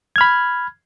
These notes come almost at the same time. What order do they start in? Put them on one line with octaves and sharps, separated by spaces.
G#6 F6 B5